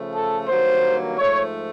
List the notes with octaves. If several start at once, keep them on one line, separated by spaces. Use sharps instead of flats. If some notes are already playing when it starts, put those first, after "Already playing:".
Already playing: C#3 F3 A3
A4
G2 D#3 F#3 A#3 C5
G#2 F3 A3 C#5